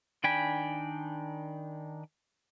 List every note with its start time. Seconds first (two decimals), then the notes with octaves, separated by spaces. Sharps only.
0.24 D#3 D4 G5 G#5 B5